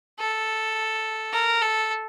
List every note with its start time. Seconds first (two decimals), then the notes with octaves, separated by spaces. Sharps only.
0.19 A4
1.33 A#4
1.62 A4